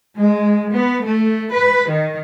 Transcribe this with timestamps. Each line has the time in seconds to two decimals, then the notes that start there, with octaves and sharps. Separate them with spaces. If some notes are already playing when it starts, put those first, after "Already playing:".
0.18 G#3
0.73 B3
1.04 A3
1.51 B4
1.90 D#3